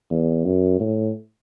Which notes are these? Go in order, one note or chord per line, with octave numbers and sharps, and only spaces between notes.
E2
F#2
A2